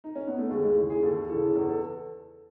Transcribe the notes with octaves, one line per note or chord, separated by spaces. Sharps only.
D#4
C#4
B3
A3
D#2 G#3
G#3
C#3 E3
G#4
D#2 A4
C#3 E3 A4
E2 A4
A4